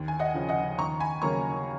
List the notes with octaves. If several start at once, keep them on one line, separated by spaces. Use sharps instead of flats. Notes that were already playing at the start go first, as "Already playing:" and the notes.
Already playing: D#2
G#5
D#5 F#5
C#3 F3
D#5 F#5
D#2 A#5 C#6
G#5 B5
C#3 F#3 A#3 A#5 C#6